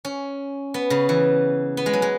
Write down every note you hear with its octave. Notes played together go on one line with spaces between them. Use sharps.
C#4
B3
C#3
E3
B3
G#3
F#3
G#3